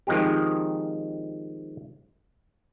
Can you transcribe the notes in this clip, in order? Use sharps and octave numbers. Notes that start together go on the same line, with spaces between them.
D#3 F3 G#3 C4 G4